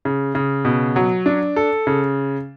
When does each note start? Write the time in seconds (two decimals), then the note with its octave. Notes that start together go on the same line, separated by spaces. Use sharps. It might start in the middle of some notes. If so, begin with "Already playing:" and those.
0.05 C#3
0.35 C#3
0.65 B2
0.96 F#3
1.26 D4
1.56 A4
1.87 C#3